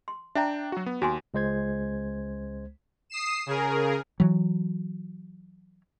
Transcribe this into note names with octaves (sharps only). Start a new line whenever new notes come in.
C6
D4 E5 G5 A#5
F#3 F#4
B3
D#2 F#4 G#5 C6
C#2 G#3 C5 G#6
D#6 C7 E7
C#3 G#4 A#4
E3 F#3